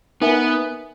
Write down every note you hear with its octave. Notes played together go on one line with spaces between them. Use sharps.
B3 D#4 A#4 E5 G#5